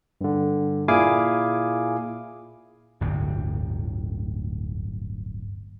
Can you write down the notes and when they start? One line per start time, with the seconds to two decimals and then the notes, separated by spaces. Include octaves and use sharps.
0.21 G2 D3
0.88 A#2 E4 G#4 F5 G#5 D6
3.01 D1 G1 D2 C3